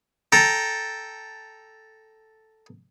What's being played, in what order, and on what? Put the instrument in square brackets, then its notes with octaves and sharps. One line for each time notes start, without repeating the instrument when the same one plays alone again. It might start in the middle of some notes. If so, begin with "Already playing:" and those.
[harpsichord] A4 G5 A#5